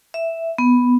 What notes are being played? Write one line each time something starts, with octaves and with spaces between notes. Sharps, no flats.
E5
B3